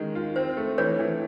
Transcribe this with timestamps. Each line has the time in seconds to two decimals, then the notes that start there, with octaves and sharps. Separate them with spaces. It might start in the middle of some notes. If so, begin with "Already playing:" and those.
Already playing: D#3 G#3 C#4
0.15 F4
0.36 C4 C5
0.57 A3
0.78 E3 B4 C#5
0.99 E3